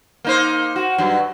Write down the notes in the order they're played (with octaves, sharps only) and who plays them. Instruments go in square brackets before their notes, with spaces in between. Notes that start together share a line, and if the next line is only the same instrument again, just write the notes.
[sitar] A#3 D#4 C5
F#4
G2 F#3